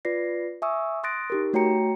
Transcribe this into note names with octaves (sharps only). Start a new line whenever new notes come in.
F4 B4 D5 A#6 C7
E5 G#5 C#6 D#6 E6
C6 D#6 F#6 A6 A#6 D7
D#4 G4 A#4
A3 F#4 C#5 G5 A#5 C#7